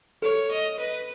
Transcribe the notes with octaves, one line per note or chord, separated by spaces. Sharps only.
A4 C#5
D#5
B4